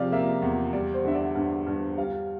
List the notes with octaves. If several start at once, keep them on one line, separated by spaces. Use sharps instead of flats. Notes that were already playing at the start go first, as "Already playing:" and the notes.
Already playing: C3 F3 D5 F5
A#3 E5
E2
G3 D5
C5
D3 E5
D5
G2
G2
G3 F5